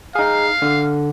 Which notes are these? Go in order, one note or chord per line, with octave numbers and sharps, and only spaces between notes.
D#4 G#4 F5
D3